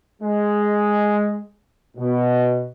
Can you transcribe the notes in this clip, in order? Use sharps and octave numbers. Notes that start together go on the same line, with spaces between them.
G#3
B2